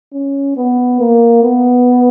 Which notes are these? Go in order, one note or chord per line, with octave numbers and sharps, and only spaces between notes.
C#4
B3
A#3
B3